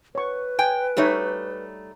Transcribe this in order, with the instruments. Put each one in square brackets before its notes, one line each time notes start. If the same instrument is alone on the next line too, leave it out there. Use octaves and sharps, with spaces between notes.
[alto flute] B4 [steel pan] C#5 C#6
[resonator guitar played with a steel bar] G5 [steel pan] G#5
[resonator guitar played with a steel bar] G3 A3 D#4 [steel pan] G4 C#5 E5